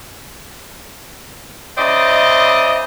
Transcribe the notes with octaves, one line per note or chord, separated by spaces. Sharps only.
C#3 E4 C5 D5 D#5